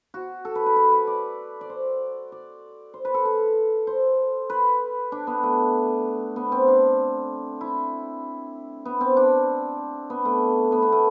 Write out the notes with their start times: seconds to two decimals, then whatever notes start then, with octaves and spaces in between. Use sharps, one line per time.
0.14 F#4
0.45 A4
0.55 B4
0.66 B4
0.76 B4
0.92 B4
1.07 D5
1.61 D5
1.70 C5
2.32 D5
2.94 C5
3.05 B4
3.14 A4
3.25 A4
3.87 C5
4.50 B4
5.12 D4
5.27 B3
5.43 A3
6.36 B3
6.52 C4
6.68 D4
7.61 E4
8.85 B3
9.01 C4
9.17 D4
10.10 B3
10.25 A3
10.72 B3
10.82 B3
10.92 A3